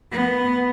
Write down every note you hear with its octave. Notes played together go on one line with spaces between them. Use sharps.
B3